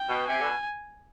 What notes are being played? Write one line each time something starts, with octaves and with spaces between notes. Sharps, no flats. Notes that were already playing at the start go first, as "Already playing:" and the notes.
Already playing: G5
B2
C3 G#5
B2 D3